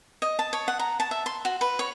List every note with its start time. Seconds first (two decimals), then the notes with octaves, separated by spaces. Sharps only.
0.22 D#5
0.39 A5
0.53 C#5
0.68 F#5
0.79 A#5
1.00 A5
1.11 E5
1.26 C6
1.45 F#4
1.61 B4
1.79 C#5